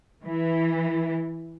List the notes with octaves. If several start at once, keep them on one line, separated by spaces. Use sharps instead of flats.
E3